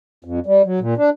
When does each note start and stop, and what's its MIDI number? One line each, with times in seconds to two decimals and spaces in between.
0.24 0.40 41
0.46 0.62 55
0.65 0.80 54
0.80 0.94 46
0.97 1.10 62